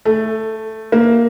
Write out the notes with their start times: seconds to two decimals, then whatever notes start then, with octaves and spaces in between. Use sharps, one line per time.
0.05 A3
0.92 A#3